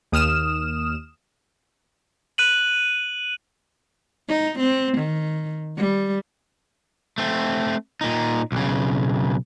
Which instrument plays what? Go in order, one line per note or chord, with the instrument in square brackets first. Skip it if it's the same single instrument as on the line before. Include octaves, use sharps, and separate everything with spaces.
[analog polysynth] D#2 D#6 F6 E7
[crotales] F#6 D#7 F#7
[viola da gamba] D#4
C4
D#3
G3
[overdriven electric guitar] A3 C4
A#2 D#4
B1 C#3